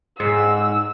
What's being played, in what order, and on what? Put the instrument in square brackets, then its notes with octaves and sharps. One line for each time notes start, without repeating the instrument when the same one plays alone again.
[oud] G#2 [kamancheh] E6